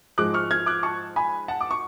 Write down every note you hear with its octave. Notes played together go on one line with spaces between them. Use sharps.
G#2 F3 G#3 D6 F#6
C#6 F6
F6 G#6
D6 F#6
A5 C#6
G#5 B5
F#5 A5
D6
C#6